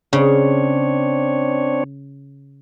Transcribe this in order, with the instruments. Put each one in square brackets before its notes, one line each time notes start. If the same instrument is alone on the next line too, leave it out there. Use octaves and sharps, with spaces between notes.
[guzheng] C#3 [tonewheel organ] C4 D4 C#5